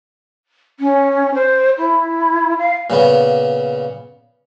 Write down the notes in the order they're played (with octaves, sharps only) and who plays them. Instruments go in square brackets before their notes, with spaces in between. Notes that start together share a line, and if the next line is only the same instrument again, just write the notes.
[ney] C#4
C5
E4
F5
[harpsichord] A#2 C#3 B3